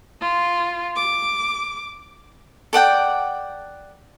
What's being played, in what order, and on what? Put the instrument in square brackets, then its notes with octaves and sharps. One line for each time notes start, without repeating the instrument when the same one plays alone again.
[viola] F4
D6
[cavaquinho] A4 D5 F#5 G5